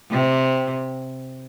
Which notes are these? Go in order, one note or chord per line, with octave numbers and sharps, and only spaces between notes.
C3